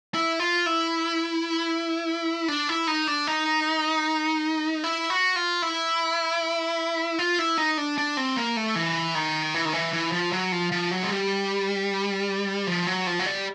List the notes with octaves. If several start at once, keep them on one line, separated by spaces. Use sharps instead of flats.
E4
F4
E4
D4
E4
D#4
D4
D#4
E4
F#4
F4
E4
F4
E4
D#4
D4
D4
C4
A#3
A3
E3
D#3
E3
D#3
E3
E3
F3
F#3
F3
F3
F#3
G#3
G3
F3
F#3
F3
F#3
G3